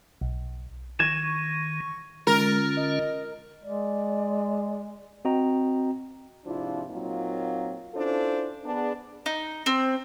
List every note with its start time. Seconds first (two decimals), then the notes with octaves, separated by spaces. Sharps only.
0.21 B1
0.99 D#3 C#6 G#6 E7
2.27 D3 G#3 C#4 F4 A#4
2.77 D#5
3.63 G#3 D5
5.25 C4 F#4 D#5 G5 A#5
6.45 G#2 C3 F3 D4 E4 F4
6.90 A#2 F#3 A#3 C4 D#4 F4
7.94 C#4 D4 E4 F4 A4 C5
8.64 B3 D4 G#4
9.26 D#4
9.66 C4